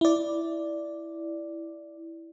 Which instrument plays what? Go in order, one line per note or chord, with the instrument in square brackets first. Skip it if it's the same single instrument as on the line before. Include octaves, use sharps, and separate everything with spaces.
[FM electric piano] E4 D5